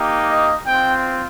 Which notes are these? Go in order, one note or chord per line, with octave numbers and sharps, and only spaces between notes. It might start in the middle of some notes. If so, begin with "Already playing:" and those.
Already playing: A#3 D#4 G4
D#5
C4 F4 G5